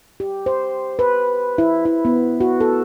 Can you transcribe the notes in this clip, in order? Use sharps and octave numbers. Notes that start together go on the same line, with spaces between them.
G4
C5
B4
E4
E4
B3
F#4
A4